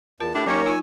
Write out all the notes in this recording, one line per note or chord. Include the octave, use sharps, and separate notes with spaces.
E2 F4 A#4 A5
A2 D4 E4 G4
F#3 A#3 C#4 D#4 G4 C#5
D#4 F4 G#5 E6